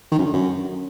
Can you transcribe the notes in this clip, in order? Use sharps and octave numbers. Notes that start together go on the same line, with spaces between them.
D#3
F#2
D3
F#2